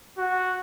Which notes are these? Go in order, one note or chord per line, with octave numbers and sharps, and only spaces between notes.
F#4